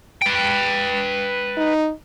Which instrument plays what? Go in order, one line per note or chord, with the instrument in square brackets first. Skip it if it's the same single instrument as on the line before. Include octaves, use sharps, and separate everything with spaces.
[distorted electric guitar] B4 G5
[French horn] D#4